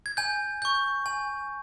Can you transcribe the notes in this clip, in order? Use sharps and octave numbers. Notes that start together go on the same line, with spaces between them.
G#6
G#5 G6
C#6 G6
G#5